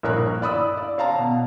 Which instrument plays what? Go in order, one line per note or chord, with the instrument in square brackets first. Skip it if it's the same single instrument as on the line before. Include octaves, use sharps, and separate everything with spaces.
[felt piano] A#1 G2 A#4 C#5 F#6
D5 B5 D#6 E6
D5
C#5 F5 A5 A#5
B2